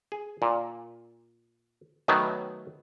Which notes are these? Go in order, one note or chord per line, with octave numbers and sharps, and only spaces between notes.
G#4
A#2
D#3 F#3 A3 B3